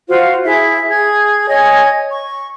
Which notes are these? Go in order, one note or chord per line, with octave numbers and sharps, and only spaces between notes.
F4 F#4 C5 F5
E4 G#4 E5
G#4 G#6
C#5 D#5 G#5
C#6